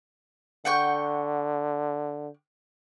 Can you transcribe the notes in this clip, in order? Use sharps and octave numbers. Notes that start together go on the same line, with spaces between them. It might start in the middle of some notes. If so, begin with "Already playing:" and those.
D3 F#5 G5 C#6